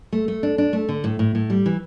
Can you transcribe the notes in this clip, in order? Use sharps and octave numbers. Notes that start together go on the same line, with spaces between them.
A3
A3
D4
D4
A3
D3
A2
A2
A2
G3
E3